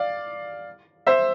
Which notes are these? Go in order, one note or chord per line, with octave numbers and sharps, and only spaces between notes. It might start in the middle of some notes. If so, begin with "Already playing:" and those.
Already playing: D5 F5
C5 E5